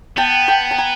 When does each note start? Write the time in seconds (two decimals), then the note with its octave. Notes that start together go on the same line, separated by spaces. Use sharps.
0.17 B3 G5 A5
0.48 G5 A5
0.71 A5
0.78 G#5 A#5